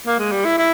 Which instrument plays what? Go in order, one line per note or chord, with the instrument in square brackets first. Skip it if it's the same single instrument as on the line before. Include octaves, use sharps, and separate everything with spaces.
[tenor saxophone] A#3
G#3
G3
E4
E4